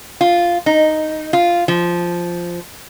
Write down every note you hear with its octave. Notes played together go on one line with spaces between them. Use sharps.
F4
D#4
F4
F3